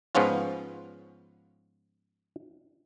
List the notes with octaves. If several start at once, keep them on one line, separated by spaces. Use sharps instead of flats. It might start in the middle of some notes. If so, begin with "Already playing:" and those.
G#2 F3 B3 C#4 F4